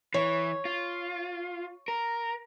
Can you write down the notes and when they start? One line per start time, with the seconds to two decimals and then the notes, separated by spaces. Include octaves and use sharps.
0.14 E3 C#5
0.65 F4
1.88 A#4